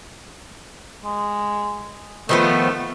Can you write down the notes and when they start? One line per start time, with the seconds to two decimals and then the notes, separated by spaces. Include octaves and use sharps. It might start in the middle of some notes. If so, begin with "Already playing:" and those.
1.04 G#3
2.29 D#3 F3 A3 B3